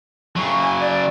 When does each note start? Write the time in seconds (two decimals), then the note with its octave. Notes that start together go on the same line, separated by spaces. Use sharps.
0.36 C#3 F#3 C#6
0.60 G#5
0.80 D5